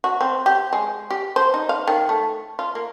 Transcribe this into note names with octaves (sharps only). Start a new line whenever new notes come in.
F#4
C4
G4
G#3
G4
C5
D#4
F5
D#3
A3
F4
A#3